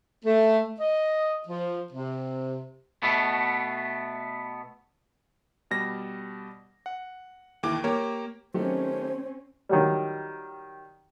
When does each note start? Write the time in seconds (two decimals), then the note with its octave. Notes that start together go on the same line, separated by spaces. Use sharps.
0.25 A3
0.80 D#5
1.48 F3
1.92 C3
3.03 B2 A3 B3
5.71 B2 G3 A#6
6.86 F#5
7.63 D#2 E3 D6
7.84 A#3 G4 A#4 C#5
8.54 D#3 F#3 A3 C4 C#4 G4 C5
9.69 D#3 F#3 G3